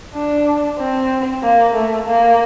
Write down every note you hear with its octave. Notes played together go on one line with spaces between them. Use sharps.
D4
C4
A#3
A3
A#3